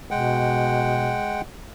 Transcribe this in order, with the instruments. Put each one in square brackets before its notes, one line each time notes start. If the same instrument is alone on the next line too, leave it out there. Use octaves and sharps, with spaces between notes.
[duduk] B2 [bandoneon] G#3 F#5 G5